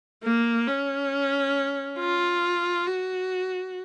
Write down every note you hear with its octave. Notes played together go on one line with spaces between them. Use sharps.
A#3
C#4
F4
F#4